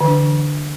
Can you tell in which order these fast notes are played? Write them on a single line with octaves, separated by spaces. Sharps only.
D3 E3 D4